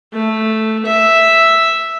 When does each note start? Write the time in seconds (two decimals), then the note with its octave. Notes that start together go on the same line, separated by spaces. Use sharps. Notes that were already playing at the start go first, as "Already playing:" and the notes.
0.13 A3
0.86 E5